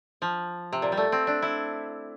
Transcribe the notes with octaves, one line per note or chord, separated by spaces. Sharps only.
F3
C3
A#2
G3
A3
C4
D4
E4